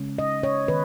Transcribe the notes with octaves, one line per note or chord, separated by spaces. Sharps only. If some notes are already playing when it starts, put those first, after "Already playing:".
Already playing: C#3 G#3 C#4
D#5
C#5
D#3 B4